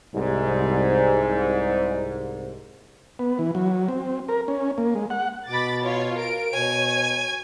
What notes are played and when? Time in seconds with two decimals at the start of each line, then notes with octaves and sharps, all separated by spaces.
0.14 C2 G#2
3.19 B3
3.39 E3
3.55 F#3
3.88 C4
4.28 A#4
4.48 C#4
4.78 A#3
4.95 G#3
5.10 F#5
5.48 B2 B5 D6 A6
5.82 F4 C#5
6.18 A#4 D7
6.54 B2 C#5 G#5